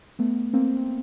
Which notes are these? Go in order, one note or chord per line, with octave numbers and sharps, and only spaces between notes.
A3 B3
A#3 C4
C4